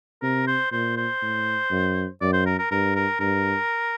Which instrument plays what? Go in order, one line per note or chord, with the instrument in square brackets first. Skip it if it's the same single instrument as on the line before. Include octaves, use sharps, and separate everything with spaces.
[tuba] C3 [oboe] A#4
[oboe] C5
[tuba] A#2 [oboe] C5
[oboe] C5
[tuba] A2
F#2
[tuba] F#2 [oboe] D5
[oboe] C5
A#4
A#4
[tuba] G2 [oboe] A#4
[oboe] A#4
[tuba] G2 [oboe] A#4